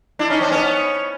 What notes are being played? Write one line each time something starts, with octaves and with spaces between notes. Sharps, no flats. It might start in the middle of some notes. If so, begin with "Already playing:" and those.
D4 E4
C#4 D#4
C4 D4
B3 C#4